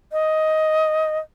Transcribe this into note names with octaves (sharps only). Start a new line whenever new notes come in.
D#5